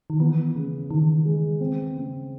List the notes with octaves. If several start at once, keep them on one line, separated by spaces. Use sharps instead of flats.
D#3
E3 B3
C#3
D#3 E3
G#3
C4
C#3